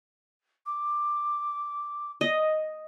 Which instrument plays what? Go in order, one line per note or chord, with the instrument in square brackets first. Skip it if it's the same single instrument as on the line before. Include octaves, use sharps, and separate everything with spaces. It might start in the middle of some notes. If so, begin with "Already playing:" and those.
[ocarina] D6
[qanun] D#5